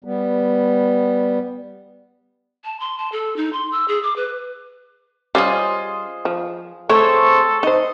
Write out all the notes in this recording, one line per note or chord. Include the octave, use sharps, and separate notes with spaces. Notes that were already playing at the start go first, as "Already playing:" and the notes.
G3 B3
A5
C6
A5
A4
D#4
C6
E6
G#4
D6
B4
G3 C#4 F4 G#4 C5 D#5
F3
A3 C4 G#4 A4 C5 C#5
D#4 C5 D#5